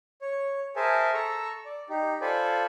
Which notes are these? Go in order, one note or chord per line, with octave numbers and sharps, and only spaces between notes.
C#5
G#4 A#4 C5 E5 G#5 A5
A4 A#5 C#6 E6
D5
D#4 G4
F4 A4 C5 D5 G#5 B5